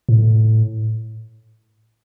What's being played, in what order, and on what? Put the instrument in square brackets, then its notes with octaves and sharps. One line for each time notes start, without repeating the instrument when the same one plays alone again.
[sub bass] A2